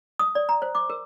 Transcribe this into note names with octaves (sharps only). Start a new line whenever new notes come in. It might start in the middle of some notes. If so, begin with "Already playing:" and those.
D#6
D5
A#5
C5
D6
A#4